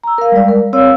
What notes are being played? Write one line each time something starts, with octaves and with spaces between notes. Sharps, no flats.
A#5 E6
A#4 F5
G3 G#3 D5
A#4
C4 C#5 F5 E6